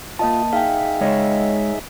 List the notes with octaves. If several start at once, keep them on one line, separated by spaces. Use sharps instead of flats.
A#3 F4 D#5 A5
D#4 G#4 E5 F5 G5
G#3 C#5 D#5